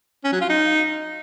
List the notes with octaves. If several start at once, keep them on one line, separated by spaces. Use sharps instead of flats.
C#4
F#3
F4
D#4